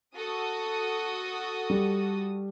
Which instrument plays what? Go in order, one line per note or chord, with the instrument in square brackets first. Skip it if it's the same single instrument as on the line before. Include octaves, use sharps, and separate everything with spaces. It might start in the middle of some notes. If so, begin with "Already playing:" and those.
[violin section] F#4 A4 D#6
[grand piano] G3